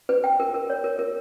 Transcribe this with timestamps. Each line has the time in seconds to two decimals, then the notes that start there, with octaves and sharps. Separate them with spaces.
0.09 B4
0.24 G5
0.40 A#4
0.54 A#4
0.70 C#5
0.84 A#4
0.99 A#4